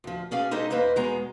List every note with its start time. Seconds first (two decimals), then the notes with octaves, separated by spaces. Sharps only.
0.04 D2 F3
0.31 B2 C#4 G#4 D5 F5
0.51 G#3 D#4 G4 A4 C5 D#5
0.70 E2 A#3 B4 C5 D#5
0.96 E2 B2 G#3 B3 A#5